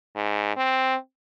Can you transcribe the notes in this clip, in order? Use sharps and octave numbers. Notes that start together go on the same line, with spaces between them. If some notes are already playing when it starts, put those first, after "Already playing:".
G#2
C4